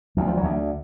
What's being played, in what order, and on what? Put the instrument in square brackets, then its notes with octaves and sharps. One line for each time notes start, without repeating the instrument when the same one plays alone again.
[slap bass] D2 F#3
F3
F#3
D2